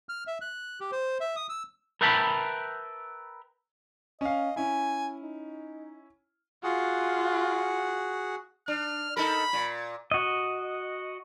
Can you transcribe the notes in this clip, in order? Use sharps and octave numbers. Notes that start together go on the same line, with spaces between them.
F6
E5
F#6
G4
C5
E5
D#6
E6
A#4 B4 E5 G5 A5 B5
C#4 D#5 F5
C#4 E4 G#5
D#4
F4 F#4 G#4 F#5
D4 F6
D#4 A4 A#4 B5
A#2
F#4 D#5